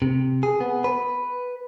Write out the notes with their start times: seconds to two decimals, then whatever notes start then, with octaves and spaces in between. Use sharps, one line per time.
0.02 C3
0.43 G#4
0.60 B3
0.84 B4